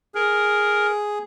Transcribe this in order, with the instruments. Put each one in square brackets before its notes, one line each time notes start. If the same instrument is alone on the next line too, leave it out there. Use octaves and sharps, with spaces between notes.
[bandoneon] G#4 [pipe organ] A#4